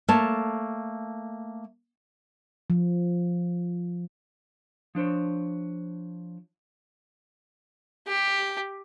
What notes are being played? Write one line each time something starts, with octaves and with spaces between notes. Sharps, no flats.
A3 A#3 C#5 A5
F3
F3 D4 C5 C#5
G4